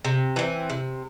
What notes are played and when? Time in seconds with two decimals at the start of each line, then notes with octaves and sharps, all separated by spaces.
0.05 C3
0.36 E3 A3 C4
0.70 C3